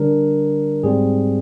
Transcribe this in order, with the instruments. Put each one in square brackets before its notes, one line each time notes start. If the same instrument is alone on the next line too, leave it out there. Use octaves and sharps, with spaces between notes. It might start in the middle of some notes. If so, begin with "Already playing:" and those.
Already playing: [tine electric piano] D3 G3 D4 A#4
G#2 G3 C4 G#4